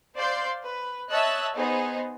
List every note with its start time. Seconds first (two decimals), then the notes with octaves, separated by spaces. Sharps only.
0.15 C5 D5 F5 C6 G6
0.63 B4
1.11 C#5 D#5 E5 A5 E6 F#6
1.55 B3 D#4 G#4 C5